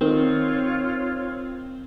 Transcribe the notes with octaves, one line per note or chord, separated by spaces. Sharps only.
D#3 C4 F4 C#5